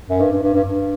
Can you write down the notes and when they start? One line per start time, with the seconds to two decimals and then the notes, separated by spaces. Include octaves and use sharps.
0.10 F#2
0.20 G2
0.32 G2
0.43 G2
0.54 G2
0.65 G2